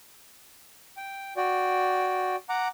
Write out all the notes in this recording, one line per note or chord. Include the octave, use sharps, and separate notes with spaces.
G5
F#4 D5 G5
F#5 A#5 D6